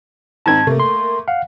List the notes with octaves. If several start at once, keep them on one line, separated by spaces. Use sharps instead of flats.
G#2 D#3 C4 A5 G#6
C3 A3 A#3
C6
F5 F#5